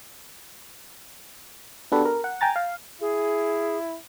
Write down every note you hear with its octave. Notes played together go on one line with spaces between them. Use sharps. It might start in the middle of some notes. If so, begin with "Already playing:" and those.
B3 D4 F#4 G4 A4 B4
A#4
F#5
G5 G#5 A#5 A6
F5
E4 G#4